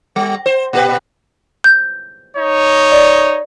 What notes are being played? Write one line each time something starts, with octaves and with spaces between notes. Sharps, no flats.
G3
C5
A#2 G4 B4
G6
D#4 C#5
D5